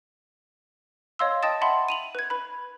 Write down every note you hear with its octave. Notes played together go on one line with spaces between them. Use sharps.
C#5 D#5 F5 C6 E6
D#5 G5 A5 D#6 A6 E7
E5 F#5 A5 B5 C6
D#7 F7 F#7
B4 G#6
B4 B5